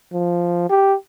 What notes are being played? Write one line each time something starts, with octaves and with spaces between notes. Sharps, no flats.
F3
G4